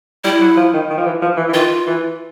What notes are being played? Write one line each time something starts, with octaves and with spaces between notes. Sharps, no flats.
G3 E4
F#3
F3
D#3
D#3
F3
E3
F3
E3
E3
D#3 F4
E3